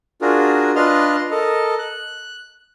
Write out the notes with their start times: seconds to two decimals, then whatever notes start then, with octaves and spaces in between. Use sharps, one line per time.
0.21 D4 F4 F#4 G#4 A#4
0.76 D4 F4 B4 D#5 C6 F6
1.31 A4 A#4 D#5
1.79 F#6